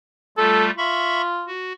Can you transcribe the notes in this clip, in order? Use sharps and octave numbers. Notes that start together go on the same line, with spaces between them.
G3 A3 F4 A4
F4 E5 B5 C#6
F#4